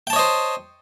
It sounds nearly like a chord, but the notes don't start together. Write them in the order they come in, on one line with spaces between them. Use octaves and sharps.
G5 A5 C#5 D#5 C5